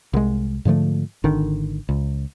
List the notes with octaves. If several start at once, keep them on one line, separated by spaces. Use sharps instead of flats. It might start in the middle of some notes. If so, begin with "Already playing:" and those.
C2 G#3
G#2 D3 F3 A3
G#1 D3 D#3
C#2